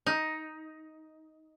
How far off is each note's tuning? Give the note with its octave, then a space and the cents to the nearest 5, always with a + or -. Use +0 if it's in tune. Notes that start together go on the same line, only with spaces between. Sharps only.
D#4 +10